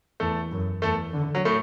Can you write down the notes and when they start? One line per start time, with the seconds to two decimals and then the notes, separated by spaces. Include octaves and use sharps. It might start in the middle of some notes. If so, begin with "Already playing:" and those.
0.20 E2 A3 A4
0.51 F#2
0.82 E2 A3 A4
1.13 D3
1.35 F#3
1.45 A2 A3